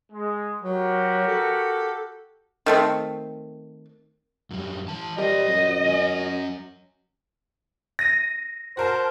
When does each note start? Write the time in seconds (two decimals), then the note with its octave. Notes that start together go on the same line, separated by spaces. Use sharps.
0.12 G#3
0.62 F#3 F#4 G4 A#4
1.27 A4
2.66 D#3 A3 C4
4.51 F#2 G3
4.88 E3 A5
5.18 G3 A#4 C5 D#5
5.49 F#2
5.85 F#3 C#4 G#5
7.99 A#6 D#7
8.77 F#4 A#4 C5 A5